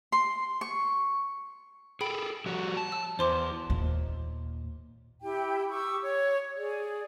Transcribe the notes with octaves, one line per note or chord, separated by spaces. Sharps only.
C6
C#6
G#4 A4 G5 B5 D7
F3 G3 F#4
A5
E6
E2 C5 C6 D6
D#2 A#2
E4 G4 G5
G4 C#6 D#6 E6
C#5
G#4 D5